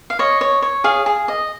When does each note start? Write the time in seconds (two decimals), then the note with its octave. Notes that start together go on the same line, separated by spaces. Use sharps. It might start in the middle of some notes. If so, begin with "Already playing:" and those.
0.10 F5
0.19 C#5 D#5
0.41 C#5
0.62 C#5
0.84 G#4 F5
1.06 G#4
1.28 D#5